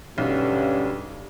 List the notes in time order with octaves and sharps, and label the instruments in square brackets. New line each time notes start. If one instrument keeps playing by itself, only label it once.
[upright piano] B1 [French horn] G2 [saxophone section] D3 C#4